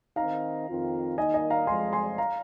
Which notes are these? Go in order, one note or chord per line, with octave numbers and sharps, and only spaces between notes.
D#3 C4 D#4 F5 A#5
F2 D#3 C4 F4
D#3 A#3 D#4 D#5 G#5
D#5 G#5
F5 A#5
F2 F3 G#3 G#5 C6
G#5 C6
F5 A#5